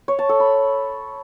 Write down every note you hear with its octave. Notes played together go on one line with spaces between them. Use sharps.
C#5
A5
A4
B5